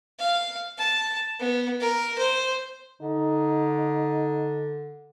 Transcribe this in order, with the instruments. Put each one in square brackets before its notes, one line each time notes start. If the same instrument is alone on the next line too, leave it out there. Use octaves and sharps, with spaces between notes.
[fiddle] F5
A5
B3
A#4
C5
[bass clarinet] D3 [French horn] D#4